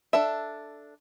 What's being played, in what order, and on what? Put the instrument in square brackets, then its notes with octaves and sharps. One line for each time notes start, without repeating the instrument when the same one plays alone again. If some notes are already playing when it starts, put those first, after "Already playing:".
[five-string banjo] D4 A4 E5